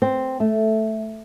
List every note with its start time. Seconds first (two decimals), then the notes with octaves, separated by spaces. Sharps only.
0.02 C4
0.40 A3